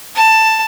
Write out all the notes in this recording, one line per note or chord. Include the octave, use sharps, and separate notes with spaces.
A5